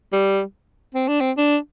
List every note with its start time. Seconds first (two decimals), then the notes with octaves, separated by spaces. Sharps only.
0.12 G3
0.95 C4
1.08 D4
1.20 C4
1.37 D4